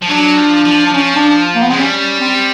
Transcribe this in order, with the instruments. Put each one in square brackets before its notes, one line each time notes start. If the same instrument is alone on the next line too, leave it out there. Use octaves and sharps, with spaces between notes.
[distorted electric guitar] F3
[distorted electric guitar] F#3 [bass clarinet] D4
[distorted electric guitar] F3
F3
[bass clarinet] D4
[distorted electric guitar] F3 [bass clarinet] C#4
[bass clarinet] D4
A#3
B3
[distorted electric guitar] G#3 [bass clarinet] C4
[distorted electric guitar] G3 [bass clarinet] C#4
[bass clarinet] C4